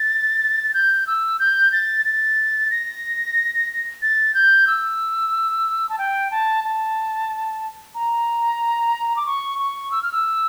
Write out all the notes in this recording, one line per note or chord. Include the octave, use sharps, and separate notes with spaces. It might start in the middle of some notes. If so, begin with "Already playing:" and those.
Already playing: A6
G6
E6
G6
A6
A6
A#6
A6
G6
E6
A5
G5
A5
A5
A#5
D6
C#6
C#6
E6
F6
E6